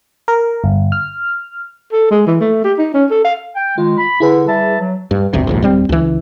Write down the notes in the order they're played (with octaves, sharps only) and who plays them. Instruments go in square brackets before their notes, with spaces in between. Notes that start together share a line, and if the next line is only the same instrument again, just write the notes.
[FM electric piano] A#4
G1
F6
[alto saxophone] A4
G#3
E3
A3
G4
D#4
C#4
A4
F5
[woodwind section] G5
[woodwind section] D#3 G#3 [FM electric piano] F4
[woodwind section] B5
[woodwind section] D3 [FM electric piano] E4 G#4 B4
[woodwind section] G3 E5 A5
F#3
[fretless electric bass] G2
G1 D2 C3
A#1 D#2 G#2
D1 G3 C4
C#2 E3